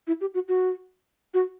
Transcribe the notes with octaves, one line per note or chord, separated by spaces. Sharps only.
E4
G4
F#4
F#4
F#4